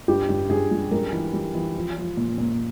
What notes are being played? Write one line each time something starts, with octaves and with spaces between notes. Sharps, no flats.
G2 G4
G2
G2 G#4
G3
G3 A#4
E3
G3
E3
F3
F3
A#2
A#2